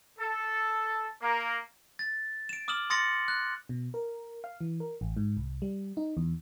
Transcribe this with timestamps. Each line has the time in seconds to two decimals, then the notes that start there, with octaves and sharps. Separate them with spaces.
0.19 A4
1.22 A#3
1.99 A6
2.49 D7 E7
2.68 D6 D#6 F6 E7 F#7
2.90 C6 D#6 A6 A#6 C#7 F#7
3.28 F#6
3.69 B2
3.94 A#4
4.44 F5
4.61 E3
4.80 A#4
5.01 A1
5.17 G#2
5.37 C2
5.62 G3
5.97 D#4
6.17 E2